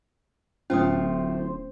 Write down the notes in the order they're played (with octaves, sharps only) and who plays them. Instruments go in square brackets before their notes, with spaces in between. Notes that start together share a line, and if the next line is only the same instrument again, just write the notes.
[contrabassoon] D1 [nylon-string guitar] A2 F4 [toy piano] C#4 D#6 [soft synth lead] C5